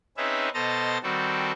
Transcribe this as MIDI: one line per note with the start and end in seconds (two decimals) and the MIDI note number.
0.17 0.49 60
0.17 0.49 61
0.17 0.49 63
0.17 0.49 68
0.17 0.49 71
0.17 0.49 76
0.54 0.98 47
0.54 0.98 69
0.54 0.98 72
0.54 0.98 75
0.54 0.98 82
0.54 0.98 93
1.03 1.52 51
1.03 1.52 55
1.03 1.52 60
1.03 1.52 66
1.03 1.52 69